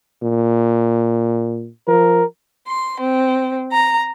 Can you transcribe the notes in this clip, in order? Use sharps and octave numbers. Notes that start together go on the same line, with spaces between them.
A#2
F3 A#4
C6
C4
A#5